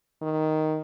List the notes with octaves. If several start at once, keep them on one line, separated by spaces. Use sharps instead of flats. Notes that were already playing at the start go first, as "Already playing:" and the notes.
D#3